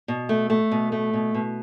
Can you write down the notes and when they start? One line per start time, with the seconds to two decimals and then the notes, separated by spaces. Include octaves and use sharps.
0.08 B2
0.29 A3
0.50 A3
0.72 B2
0.92 A3
1.13 B2
1.34 B2